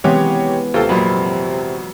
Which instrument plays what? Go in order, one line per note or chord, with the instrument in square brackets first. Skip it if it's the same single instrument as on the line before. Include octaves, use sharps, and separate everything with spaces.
[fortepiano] C3 [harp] E3 G#3 B3 [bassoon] G4 [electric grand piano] C#5
[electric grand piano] D#2 A4 [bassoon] C3 [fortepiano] F4
[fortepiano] F2 A#2 [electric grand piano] F#3 [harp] B5